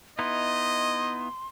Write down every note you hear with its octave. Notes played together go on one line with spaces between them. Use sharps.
B3 D#4 E4 D#5 C6